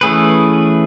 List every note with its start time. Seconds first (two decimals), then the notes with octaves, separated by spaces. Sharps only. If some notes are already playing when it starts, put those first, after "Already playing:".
0.01 E3 A3 C#4 G#4 B4